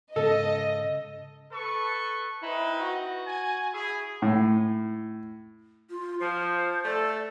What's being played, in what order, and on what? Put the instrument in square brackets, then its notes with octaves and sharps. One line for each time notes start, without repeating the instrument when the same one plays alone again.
[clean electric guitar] G#2 C#3 [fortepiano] A4 [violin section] D#5
[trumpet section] A4 B4 C#6
[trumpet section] C4 D#4 B4 [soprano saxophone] E4
[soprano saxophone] F#4
[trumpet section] G#5
E4 G#4
[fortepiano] A2
[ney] F4
[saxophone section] F3 [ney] C5
[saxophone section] A3 A4 [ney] D5